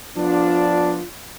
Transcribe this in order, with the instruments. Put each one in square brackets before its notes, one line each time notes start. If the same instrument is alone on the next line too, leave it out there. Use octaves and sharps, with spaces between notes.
[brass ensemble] F3 B3 D4 [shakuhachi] F4